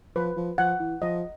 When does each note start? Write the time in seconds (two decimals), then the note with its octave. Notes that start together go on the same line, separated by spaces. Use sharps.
0.16 F3 B4
0.36 F3
0.58 F3 F#5
0.80 E3
1.02 F3 D#5